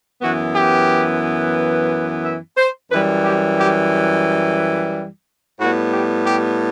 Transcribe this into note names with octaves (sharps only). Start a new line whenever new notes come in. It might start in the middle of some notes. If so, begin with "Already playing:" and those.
F#2 E3 B3 F#4
G4
E5
C5
F#2 E3 G3 B4
G4
G4
A2 G3 B3 F#4
G4
G4